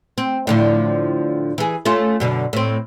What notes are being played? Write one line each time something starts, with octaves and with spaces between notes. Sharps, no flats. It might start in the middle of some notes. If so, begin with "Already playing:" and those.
C4
A2 D3 F3
E3 G#4
A3 C#4 F4
F#2 B2 D3
A2 C4